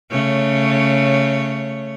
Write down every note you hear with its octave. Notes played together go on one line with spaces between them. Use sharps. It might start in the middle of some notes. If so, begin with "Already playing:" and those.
C#3 A3 C#5